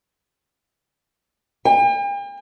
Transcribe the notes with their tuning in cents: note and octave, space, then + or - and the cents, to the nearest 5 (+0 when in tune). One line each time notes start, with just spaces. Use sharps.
G5 +45